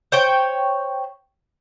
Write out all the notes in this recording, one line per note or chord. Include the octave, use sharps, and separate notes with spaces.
C5 C#5 G5